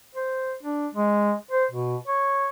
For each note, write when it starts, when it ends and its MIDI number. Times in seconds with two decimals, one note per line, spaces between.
0.15 0.54 72
0.63 0.87 62
0.95 1.33 56
1.51 1.66 72
1.71 1.96 47
2.07 2.49 73